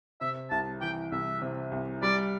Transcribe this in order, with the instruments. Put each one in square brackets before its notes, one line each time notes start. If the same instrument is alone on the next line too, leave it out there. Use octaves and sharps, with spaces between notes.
[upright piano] C3 [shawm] E5
[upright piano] C2 [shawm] A5
[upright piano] E3 [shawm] G5
[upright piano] C2 [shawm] E5
[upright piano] C3
C2
[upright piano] G3 [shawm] D5